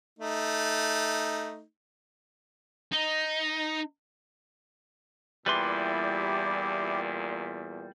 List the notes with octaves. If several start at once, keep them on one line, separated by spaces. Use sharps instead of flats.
A3 D#4
D#4
E2 A#2 G3 E4 G4 B4 D5 C6